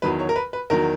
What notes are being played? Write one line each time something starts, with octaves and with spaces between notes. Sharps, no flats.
E2 D#3 F#3 B4
C#5
A#4
B4
B4
E2 D#3 F#3 A#4